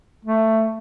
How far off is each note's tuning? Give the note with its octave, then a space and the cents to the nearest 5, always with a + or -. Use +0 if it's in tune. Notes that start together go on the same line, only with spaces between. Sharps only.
A3 +10